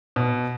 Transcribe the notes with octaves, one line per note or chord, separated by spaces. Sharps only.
B2